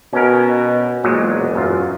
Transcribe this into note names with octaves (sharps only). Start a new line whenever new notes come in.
B2 C#4 A#4
E1 A#2 F#3 G#3
F#2 F4